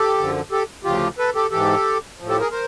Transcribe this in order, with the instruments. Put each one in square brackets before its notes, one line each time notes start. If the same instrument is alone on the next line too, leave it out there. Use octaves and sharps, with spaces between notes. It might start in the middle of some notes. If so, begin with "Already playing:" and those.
Already playing: [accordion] G4 A4
F#2 D3 F3
G4 A4
D2 C#3 F3 F4 G4
A4 B4
G4 A4
G#2 E3 G4 A4
A2 F3
G4 A4
G#4 A#4
A#4 C5